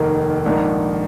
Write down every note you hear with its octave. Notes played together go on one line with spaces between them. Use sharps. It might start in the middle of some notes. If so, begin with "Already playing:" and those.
Already playing: F1 D#2 D#3 A#3
A#1 G#2 D#3 A#3